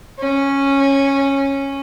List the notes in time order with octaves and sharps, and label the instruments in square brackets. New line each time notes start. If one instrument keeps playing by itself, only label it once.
[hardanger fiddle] C#4